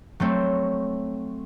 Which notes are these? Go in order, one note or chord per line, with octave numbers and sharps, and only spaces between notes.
F#3 A3 C4